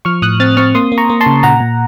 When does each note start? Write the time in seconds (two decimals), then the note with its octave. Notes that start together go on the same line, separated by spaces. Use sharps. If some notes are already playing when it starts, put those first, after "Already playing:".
0.05 F3 C#6 F6
0.22 A2 D#6 F#6
0.40 C4 F6 A6
0.57 C4 C#6 F6
0.75 A#3 C6 D#6
0.92 A#3
0.98 A#5 C#6
1.10 A#3
1.21 A5 C6
1.26 C#3
1.43 A#2 F#5 A#5
1.60 A#2